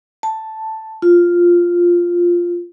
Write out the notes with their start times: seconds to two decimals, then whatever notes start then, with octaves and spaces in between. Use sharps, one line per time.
0.23 A5
1.02 F4